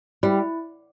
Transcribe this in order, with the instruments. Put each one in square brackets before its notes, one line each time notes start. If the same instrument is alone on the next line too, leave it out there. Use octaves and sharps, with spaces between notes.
[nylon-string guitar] G3 [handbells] E4